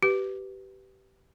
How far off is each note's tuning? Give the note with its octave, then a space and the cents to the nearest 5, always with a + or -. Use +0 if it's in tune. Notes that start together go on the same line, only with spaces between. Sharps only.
G4 -20 B4 +0